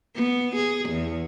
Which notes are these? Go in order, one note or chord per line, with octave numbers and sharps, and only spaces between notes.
B3
G#4
E2